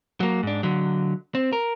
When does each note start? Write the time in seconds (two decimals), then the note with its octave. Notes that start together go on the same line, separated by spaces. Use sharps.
0.20 F#3 A#3
0.43 G#2 D4
0.63 D3 F#3
1.35 C4
1.53 A#4